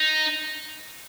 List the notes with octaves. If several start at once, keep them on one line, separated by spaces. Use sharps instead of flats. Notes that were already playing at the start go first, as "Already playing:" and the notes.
Already playing: D#4